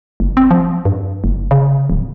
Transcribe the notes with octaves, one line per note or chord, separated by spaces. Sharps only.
F#1
C4
F3
G2
F#1
C#3
D1